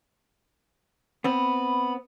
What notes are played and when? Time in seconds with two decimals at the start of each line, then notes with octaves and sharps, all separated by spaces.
1.24 B3 C4 B5